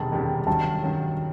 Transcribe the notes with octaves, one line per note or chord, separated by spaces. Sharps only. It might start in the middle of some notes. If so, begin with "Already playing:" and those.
Already playing: E1 E2 C3 D#3 G3 A5
E1 E2 C3 D#3 G3
G2 D#3 F#3 A5
G2 D#3 F#3